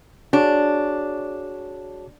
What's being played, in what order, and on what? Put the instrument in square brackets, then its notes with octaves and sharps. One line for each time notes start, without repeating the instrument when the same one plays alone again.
[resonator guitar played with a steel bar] D4 [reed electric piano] F#4 G#4 C#5